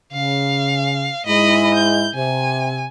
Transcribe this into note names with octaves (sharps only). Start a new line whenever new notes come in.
C#3 F5
G#2 G#3 E4 D#5 B5
G6
C3 G#5